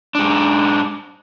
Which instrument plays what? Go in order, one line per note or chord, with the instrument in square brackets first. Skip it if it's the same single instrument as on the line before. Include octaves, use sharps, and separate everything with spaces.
[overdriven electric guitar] G#2 D4